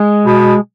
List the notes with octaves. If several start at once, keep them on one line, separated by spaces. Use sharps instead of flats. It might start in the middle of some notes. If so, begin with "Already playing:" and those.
Already playing: G#3
B2